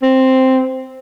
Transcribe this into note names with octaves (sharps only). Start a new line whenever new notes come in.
C4